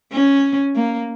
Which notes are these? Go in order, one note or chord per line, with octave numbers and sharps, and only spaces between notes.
C#4
A#3